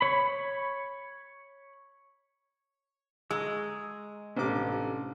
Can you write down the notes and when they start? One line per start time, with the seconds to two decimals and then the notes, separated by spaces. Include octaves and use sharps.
0.01 C#5 B5
3.31 G#3 A#5 C#6 E6
4.36 A1 C3 C#4 D4 A4 D6